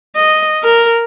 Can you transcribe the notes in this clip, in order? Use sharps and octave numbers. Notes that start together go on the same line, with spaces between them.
D#5
A#4